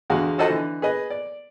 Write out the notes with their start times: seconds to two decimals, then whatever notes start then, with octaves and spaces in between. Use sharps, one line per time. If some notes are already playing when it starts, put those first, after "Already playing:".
0.10 E2 D3 G#3 F#4 F5
0.38 F4 F#4 A4 C5 D#5 A5
0.50 D3 E3
0.82 G#4 B4 D#5
1.10 D5